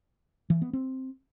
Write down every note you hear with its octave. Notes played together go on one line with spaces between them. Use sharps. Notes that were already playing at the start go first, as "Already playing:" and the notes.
E3
B3
C4